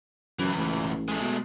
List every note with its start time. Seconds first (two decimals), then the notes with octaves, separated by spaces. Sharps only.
0.39 C#2 F#2 E3
0.57 A1
1.08 G#3 A3
1.21 B2